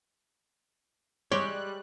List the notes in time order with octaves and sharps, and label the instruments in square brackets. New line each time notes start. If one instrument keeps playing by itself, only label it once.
[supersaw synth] G3 F#6 [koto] G#3 G4 D5 [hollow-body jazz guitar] C#5